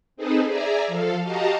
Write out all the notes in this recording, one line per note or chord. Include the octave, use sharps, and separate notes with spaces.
C4 D#4 G#4 A4 B4 C5
G#4 D5 E5 G#5 A#5
F3 A4 F5
F#4 G4 D#5 F5 A5 A#5